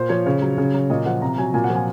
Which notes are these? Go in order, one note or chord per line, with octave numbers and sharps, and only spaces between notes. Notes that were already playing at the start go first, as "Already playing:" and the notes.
Already playing: A#2 C5
F3 C#5
C#3 C#5
F#3
C#3
F#3
A#2 D#5
F3 F#5
C3 A#5
F#3 G#5
A#2 G#5
F#5
F3
G#5